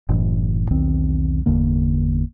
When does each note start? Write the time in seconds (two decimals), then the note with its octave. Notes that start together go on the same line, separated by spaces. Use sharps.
0.09 F#1 A2 E3
0.71 B1 E2 D#3 C4
1.46 G1 E2 D3 A#3